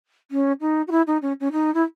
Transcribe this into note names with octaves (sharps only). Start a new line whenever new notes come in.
C#4
D#4
F#4
E4
D#4
C#4
C#4
D#4
E4